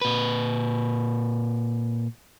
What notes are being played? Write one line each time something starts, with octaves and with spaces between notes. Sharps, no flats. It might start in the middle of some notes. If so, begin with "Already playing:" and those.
A#2 B4